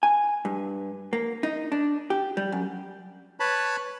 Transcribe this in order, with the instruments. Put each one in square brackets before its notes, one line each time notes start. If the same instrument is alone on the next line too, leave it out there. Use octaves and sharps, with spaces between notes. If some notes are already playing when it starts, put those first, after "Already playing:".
[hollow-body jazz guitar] G#5
G2
A#3
D#4
D4
G4
G3
F#2
[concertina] B4 C#5 A5 B5